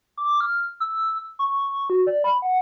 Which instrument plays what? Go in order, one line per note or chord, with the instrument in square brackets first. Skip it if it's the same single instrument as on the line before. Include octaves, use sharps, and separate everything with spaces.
[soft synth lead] D6
F6
E6
C#6
F#4
D5
B5
F#5